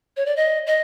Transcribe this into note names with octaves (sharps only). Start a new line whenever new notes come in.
C#5
D5
D#5
D#5